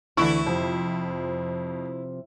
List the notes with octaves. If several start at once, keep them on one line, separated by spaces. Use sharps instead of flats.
D2 D3 E3 E4 C#6
F2 C3 F3